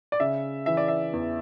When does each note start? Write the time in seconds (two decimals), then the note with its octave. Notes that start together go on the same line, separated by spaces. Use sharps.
0.12 D5
0.20 C#3 E5
0.66 E3 E5
0.77 D5
0.88 E5
1.13 E2